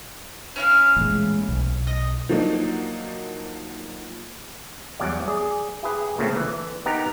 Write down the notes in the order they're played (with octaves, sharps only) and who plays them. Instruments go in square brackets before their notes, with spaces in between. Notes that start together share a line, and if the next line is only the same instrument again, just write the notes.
[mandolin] C#4 E4 F5
[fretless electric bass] A1 A#2 G#3
B1
[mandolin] D#5
[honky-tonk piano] F3 F#3 A#3 D4 D#4
[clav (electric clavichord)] E2 F#3 G3 D5
G#4 D5
E4 G4 G#4 B4
A#2 C#3 A3 C4
D3 E3
B3 D#4 G4 A#4 A#5